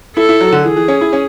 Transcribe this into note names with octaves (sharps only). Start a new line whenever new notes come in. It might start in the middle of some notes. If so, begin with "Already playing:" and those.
E4 A4
E4
F#3
D3
E3 G#4
E3
C#4
E4
C#4